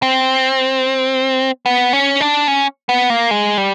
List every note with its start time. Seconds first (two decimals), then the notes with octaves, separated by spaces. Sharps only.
0.02 C4
1.66 B3
1.93 C#4
2.21 D4
2.47 C#4
2.89 B3
3.10 A#3
3.31 G#3
3.57 G3